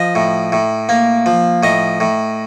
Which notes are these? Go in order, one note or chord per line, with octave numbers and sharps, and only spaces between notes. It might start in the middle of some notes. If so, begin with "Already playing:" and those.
Already playing: F3 D#5
A2
A2
A#3
F3
A2 D#5
A2